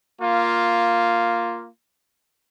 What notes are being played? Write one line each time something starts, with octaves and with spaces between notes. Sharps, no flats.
A#3 F4